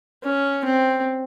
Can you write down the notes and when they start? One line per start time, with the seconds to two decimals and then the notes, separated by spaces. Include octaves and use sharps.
0.23 C#4
0.65 C4